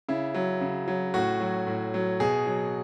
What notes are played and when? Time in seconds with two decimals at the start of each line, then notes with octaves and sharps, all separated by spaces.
0.09 C#3 E4
0.34 F#3
0.61 C#3
0.88 F#3
1.14 A2 F#4
1.41 F#3
1.67 A2
1.94 F#3
2.20 B2 G#4
2.47 F#3